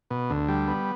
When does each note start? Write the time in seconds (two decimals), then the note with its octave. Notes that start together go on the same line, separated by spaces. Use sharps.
0.10 B2
0.30 D2
0.48 G3
0.68 B3